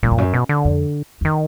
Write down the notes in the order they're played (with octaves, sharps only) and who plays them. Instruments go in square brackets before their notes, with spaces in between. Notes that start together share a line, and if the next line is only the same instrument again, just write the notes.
[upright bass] F#2 [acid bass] A#2
[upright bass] F2
F#2
[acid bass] B2
D3
[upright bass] F2
F2
[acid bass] D#3